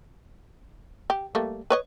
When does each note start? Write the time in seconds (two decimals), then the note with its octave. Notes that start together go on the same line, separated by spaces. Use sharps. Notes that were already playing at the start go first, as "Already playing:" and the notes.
1.10 G4
1.35 G3 A3 A#3
1.70 B4 C#5 D#5